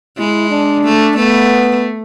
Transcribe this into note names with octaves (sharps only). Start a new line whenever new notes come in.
G#3 E4
D4
A3
A3 B3